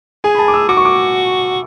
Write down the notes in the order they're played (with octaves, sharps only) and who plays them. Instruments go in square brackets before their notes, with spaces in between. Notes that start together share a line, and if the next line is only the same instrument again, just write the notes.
[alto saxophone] G#4 [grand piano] G#5
[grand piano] B5
A5
D6
E6
[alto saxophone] F#4 [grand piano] D6
[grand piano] C#6
D6